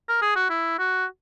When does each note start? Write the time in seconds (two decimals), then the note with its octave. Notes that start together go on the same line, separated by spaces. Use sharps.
0.09 A#4
0.22 G#4
0.36 F#4
0.50 E4
0.79 F#4